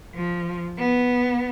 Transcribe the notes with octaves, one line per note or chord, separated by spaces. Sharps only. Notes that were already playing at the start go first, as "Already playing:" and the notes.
F3
B3